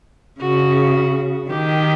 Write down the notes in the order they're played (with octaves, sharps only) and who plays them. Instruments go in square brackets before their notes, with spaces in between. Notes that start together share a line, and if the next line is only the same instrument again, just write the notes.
[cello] C#3 [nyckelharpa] F#4
[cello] D#3 [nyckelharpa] G4